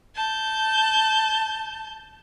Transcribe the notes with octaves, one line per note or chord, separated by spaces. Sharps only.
A5 G6